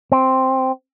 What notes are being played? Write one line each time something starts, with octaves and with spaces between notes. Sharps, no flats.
C4